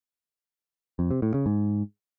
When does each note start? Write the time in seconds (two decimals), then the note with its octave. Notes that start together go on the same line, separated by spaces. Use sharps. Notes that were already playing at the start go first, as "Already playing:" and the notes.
0.99 F2
1.11 C3
1.22 A2
1.34 C#3
1.46 G#2